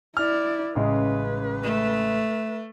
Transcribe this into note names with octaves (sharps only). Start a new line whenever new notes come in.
E4 D5 F6
A1 C#3 G#3 B4
A3